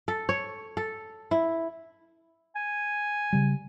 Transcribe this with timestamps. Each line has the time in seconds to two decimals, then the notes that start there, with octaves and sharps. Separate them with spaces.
0.08 A4
0.29 C#5
0.77 A4
1.31 E4
2.56 G#5
3.33 C#3 G3